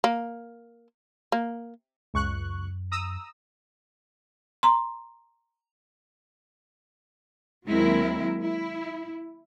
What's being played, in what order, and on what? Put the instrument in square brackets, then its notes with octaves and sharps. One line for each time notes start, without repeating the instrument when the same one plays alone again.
[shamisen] A#3
A#3
[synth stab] C#2 C#6 F#6 [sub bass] F#2
[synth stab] A#5 D#6 E6
[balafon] A#5 C6
[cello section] D#2 F#3 G#3 C4 E4 A#4
E4